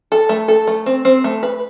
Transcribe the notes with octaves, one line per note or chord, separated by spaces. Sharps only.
A4
A3
A4
A3
C4
C4
A3
B4